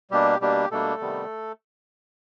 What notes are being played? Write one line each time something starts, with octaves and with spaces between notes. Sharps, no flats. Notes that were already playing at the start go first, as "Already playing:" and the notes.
B2 G3 A#3 D4 G4
B2 G3 A#3 D4 G4
B2 G3 A3 A#3 D4 A4
C3 D#3 G3 B3